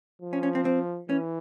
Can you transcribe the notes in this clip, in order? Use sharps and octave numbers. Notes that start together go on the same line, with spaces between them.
F3
C#4
C#4
C4
C4
E3 C#4